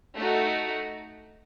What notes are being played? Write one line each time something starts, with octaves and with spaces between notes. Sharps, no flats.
A3 D#4 F#4